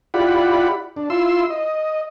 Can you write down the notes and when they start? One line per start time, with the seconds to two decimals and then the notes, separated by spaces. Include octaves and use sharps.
0.14 E4 F4 G4 D5 F#5 B5
0.97 D4
1.10 E4 F4 C6 E6
1.50 D#5